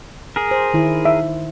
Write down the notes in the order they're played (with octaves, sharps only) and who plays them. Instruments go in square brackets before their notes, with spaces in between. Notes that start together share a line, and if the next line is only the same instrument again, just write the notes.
[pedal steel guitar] G#4 A#4
[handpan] C5
D#3 E4
[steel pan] E5